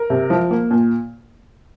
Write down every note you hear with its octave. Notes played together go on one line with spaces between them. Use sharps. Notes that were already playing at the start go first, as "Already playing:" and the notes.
Already playing: A#4
C3
F3
A#3
A#2